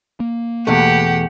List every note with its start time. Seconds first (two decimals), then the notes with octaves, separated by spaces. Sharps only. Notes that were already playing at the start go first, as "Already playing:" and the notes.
0.20 A#3
0.67 E2 B2 A3 G4 F#5